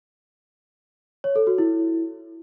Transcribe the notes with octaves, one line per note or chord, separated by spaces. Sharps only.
C#5
A4
F#4
E4